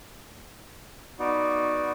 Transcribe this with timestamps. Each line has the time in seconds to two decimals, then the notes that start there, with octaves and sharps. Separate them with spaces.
1.19 B3 D#4 F#4 D5